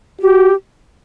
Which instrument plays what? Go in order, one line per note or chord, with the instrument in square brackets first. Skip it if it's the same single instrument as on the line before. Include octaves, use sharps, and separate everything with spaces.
[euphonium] F#4 [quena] G4